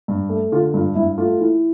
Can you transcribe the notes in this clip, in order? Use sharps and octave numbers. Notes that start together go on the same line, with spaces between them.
G2
A3
D3 F4
G2 F4
G2 E4
A3 F4
E3